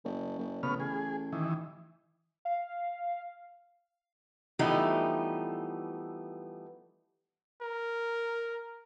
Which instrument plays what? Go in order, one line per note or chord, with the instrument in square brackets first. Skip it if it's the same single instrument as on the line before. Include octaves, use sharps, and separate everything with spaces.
[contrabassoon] F#1
F#1
[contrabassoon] A1 [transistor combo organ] C#3 B3 F6
[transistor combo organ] G#4
D#3 E3
[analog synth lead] F5
[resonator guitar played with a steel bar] E3 F3 G3 A3 B3 D#4
[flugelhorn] A#4